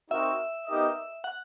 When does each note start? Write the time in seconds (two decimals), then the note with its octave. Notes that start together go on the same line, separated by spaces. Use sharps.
0.11 C4 D#4 F#4 A#4 E5
0.68 B3 D#4 G4 A#4 D#5
1.24 F#5